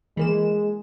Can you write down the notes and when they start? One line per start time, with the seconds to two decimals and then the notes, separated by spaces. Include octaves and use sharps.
0.17 E3 G#3 A#3 E7